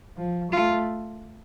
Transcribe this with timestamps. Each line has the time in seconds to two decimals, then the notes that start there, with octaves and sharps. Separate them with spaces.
0.17 F3
0.52 A3 F4